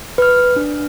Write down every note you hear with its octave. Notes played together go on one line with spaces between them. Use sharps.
B4 F6
D4